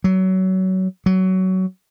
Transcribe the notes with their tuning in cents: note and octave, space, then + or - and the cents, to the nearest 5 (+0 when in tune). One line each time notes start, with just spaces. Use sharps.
F#3 +25
F#3 +20